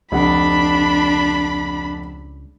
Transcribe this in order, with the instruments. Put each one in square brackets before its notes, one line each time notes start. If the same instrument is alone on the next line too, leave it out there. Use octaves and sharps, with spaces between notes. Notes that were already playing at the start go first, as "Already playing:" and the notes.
[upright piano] F1 F#5 [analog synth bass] C#2 [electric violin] D4 B5